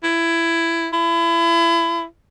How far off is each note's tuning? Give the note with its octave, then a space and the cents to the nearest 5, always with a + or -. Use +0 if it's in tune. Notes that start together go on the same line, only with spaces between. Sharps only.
E4 +15
E4 +30